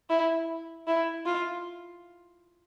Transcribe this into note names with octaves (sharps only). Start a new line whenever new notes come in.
E4
E4
F4